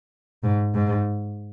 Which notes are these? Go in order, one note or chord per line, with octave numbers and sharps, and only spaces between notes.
G#2
G#2